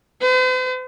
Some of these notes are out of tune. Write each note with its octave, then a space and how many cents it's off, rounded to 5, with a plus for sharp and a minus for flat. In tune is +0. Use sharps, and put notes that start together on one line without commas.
C5 -45